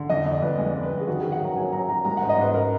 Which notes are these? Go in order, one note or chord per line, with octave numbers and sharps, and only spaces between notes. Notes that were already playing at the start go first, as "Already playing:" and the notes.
Already playing: D3
F2 D#5
F2
D5
F2 B4
G#3 D5
F2
B4
F2
G#4
D#3 F#4
D#3 G#4
F#5
F#3 A#5
F#3 G#5
F#3 A#5
F#3 A#5
G#3 A#5
G#2 F#5
D#5
G#2 B4
A#4